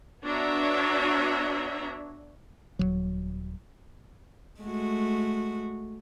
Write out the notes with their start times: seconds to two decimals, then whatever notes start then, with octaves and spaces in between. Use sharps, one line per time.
0.24 B3 D4 F#4 C#5 E5 A#5
2.79 D#1 C#2 F#3
4.61 G#3 A3 F#4